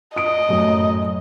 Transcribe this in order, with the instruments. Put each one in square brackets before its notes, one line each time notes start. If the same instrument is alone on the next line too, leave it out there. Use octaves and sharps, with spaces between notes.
[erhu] D#5 [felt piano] D#6 D7
[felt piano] F#2 A2